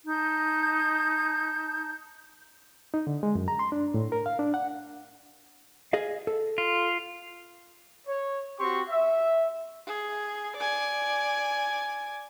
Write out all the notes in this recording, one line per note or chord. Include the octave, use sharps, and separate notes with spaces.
D#4 A5 G6
D#4
D3
G#3
F#2
A#5
C6
D4
A2
A#4
F5
D4
F#5
G#4 D#5 F5
A4
F4
C#5
C4 F#4 G4 C6 C#6
E5
G#4
D5 G#5